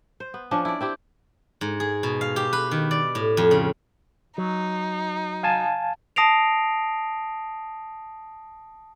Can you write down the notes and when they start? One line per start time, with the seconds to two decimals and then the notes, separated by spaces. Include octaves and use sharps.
0.20 C5
0.34 B3
0.51 F3 C#4 D4
0.65 E4 D5
0.81 C4 E4 G4
1.61 G#2
1.80 G#4
2.03 B2
2.21 F5
2.36 G4
2.53 B4
2.71 D#3
2.91 D5
3.15 A2
3.37 F2
3.51 C#3
4.38 F#3 D#4
5.43 F5 G#5 A5
6.16 A5 D#6 A#6 C7 D7 F7